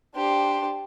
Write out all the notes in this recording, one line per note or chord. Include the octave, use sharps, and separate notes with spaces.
D4 G4 C5 C6